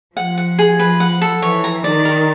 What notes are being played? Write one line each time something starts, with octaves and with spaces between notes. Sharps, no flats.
F3 F#5
F#5
G#4
B4
F#5
A4
E3 C#5
A#5
D#3 D5
A#4